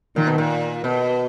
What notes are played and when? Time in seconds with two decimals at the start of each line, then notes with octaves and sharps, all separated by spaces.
0.16 A#2 D#3
0.27 B2
0.38 A#2
0.84 B2